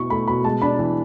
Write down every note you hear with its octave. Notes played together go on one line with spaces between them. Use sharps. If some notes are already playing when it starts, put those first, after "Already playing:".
Already playing: B2 E4 C#6
A3 B5
B2 B5
G#3 A5
D4 B5
E3